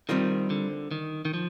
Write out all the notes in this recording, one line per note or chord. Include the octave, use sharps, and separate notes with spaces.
D#3 G3 C4 F4 A#4
D3
D#3
D#3
F3